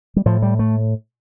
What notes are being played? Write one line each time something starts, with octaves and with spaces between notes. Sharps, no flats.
G3
A2 F3
G3
A3